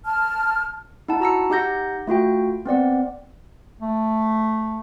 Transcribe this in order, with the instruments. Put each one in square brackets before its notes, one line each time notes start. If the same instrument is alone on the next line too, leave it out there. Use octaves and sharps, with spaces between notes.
[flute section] A5 F6
[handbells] D#4 E4 F#5 A5
F#4 A#5 E6 C#7
D#4 G4 F#5 G6 A#6
A3 F4 F#4 G5
B3 C4 D5 F#5
[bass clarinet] A3